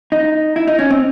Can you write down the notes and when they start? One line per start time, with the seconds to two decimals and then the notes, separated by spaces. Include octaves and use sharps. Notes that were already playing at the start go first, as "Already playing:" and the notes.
0.12 D#4
0.56 E4
0.68 D#4
0.79 C#4
0.90 C4